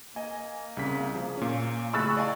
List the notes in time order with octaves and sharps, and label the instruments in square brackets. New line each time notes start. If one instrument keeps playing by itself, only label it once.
[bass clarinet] A#3 [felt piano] D#5 [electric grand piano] G#5
[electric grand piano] C2 C#3 B6
F3 G#4
A#2 C#4
[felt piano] A2 [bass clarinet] C#3 [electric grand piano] G#4 B5 F#6 [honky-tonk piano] C#6 E6 A6
[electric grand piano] D5 [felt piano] D#5 F5 G#5